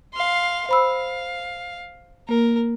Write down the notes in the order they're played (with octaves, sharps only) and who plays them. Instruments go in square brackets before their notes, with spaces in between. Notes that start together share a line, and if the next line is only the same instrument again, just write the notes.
[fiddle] F5 C6
[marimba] C5 B5 E6 [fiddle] F5
[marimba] A#3 [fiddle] A#4